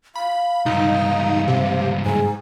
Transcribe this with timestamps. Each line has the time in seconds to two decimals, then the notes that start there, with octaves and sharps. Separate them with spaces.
0.15 F5 B5
0.66 C#2 G2 D#4
1.48 C3
2.06 G#2 G#5